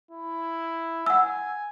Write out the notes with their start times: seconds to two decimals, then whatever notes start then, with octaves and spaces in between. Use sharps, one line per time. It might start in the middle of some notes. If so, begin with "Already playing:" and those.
0.11 E4
1.06 F#5 G#5 E6